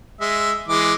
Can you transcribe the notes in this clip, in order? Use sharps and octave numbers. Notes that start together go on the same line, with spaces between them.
G#3 E5
E3 G#3 D6